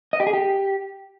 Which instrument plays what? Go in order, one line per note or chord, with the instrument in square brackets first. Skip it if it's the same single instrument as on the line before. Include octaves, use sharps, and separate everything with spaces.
[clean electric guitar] D#5
G4
G#4
G4